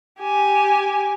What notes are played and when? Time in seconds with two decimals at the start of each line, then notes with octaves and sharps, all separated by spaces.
0.21 G4 G#5